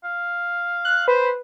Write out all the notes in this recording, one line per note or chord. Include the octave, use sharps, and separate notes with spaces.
F5
F#6
B4 C5